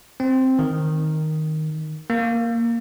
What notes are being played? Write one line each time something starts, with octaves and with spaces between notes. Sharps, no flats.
C4
D#3
A#3